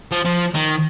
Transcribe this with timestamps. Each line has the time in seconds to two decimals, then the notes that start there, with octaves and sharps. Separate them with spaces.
0.12 F3
0.25 F3
0.55 D#3